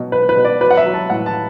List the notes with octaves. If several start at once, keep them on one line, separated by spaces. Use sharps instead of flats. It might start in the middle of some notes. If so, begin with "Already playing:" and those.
Already playing: B2 F#3
B2 B4
B4
B2
D5
F#3 B4
F#5
E5
F#3
A5
A2 F#5
A5